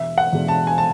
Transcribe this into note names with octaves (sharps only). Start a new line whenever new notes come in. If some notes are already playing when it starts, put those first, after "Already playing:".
Already playing: E1 E5
F#5
E2 B2 G#3 D4
A5
G#5
A5